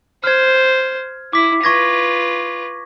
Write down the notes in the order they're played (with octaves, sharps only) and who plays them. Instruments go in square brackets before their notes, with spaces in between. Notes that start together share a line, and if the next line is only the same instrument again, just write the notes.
[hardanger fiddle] C5 [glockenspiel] F6 G#6
[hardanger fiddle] E4 [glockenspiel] D6 B6
[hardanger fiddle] F4 B4 [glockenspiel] C#6 G#6 A#6